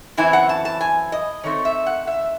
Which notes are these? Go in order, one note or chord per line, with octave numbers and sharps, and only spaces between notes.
F#2 E3 C4 E4 G#5
F#5
A5
A5
G#5
D#5
D#3 A3 C4 C#5
E5
F#5
E5